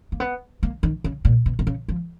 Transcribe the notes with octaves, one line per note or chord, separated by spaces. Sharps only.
A#3
B3
A#3
D#3
C#3
A#2
B2
B2
C#3
F3